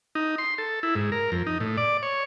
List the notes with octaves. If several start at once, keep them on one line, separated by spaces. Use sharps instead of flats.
D#4
C6
A4
E4
G#2
A#4
F2
D#4
A2
D5
C#5